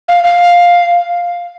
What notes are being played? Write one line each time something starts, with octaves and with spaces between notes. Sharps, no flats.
F5
F5